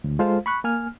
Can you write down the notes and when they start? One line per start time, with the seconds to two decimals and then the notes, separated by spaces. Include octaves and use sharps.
0.04 D2
0.19 G#3 F4 A4 C5 F5
0.46 B5 C#6 F#6
0.64 A#3 G#5 F6